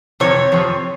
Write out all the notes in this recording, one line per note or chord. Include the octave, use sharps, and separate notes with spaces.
F2 C3 C4 C#5
F2 C3 F3 C4